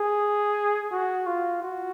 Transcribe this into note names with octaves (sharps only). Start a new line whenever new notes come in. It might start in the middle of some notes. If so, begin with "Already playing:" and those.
Already playing: G#4
F#4
F4
F#4